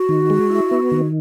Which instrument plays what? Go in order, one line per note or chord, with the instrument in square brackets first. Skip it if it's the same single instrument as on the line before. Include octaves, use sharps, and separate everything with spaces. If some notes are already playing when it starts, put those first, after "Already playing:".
Already playing: [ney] F#4
[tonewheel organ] D#3
G#3
E4
B3
D#3